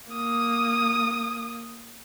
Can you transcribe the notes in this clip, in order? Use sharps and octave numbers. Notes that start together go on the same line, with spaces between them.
A#3 D#6